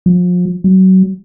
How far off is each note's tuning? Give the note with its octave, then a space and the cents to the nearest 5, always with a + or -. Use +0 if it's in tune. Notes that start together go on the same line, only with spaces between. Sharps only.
F3 +35
F#3 +25